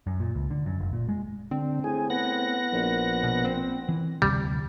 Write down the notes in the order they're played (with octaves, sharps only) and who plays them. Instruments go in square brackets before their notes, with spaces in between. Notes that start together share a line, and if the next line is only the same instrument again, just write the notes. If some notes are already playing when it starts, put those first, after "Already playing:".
[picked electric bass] F#2
A#2
C#2
D3
F#2
F1
A#2
G#3
[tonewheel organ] D3 [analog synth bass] C4
[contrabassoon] A2 [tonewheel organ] G#4
[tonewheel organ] B3 F#5 A#6
[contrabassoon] A#1
[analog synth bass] B2
C4
[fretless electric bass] E3
[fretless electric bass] F1 D2 C3 [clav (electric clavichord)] G3